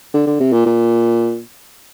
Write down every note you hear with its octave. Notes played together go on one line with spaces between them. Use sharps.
D3
D3
C3
A#2
A#2